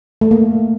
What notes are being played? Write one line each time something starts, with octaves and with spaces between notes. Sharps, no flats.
A3
A#3